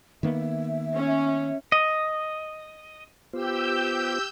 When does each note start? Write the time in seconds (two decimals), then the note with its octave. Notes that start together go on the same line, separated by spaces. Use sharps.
0.23 D#3 A#3 B3 E5
0.95 C#4
1.72 D#5
3.33 B3 F4 G4 C5 E6 G6